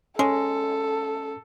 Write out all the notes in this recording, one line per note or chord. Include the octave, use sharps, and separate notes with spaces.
G#3 C#4 A4